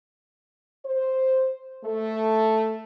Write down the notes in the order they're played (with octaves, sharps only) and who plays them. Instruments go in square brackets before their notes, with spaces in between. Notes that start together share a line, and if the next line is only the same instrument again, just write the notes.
[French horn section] C5
A3